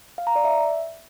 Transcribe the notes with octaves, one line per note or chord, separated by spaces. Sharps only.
F5
A#5
D5
E5